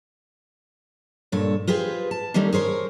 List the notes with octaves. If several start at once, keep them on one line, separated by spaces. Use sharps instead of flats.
G2 A#2 A4 C#5
F4 G4 G#4 B4 C5
A5
D#3 G3 A3 A#3 C4 C#4
G#4 A#4 C5 C#5